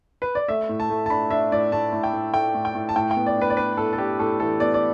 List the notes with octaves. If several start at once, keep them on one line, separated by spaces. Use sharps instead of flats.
B4
D5
A3 E5
A2
A5
A3
A5
D4 B5
D4 E5
A2 D5
A2 A5
A2
G5
A2
A3 G5
A2
G5
A2
A5
A2 G5
G5
B3
D5
D4
B4
D5
D4 B4
A2 A4
A4
D4 G4
A2 A4
E3 A4
B3 D5
D5